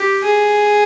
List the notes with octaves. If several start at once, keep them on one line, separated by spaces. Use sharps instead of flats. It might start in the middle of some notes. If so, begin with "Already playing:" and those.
Already playing: G4
G#4